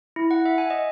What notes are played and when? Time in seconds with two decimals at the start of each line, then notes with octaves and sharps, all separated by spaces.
0.16 E4
0.31 F#5
0.46 E5
0.58 G#5
0.70 D#5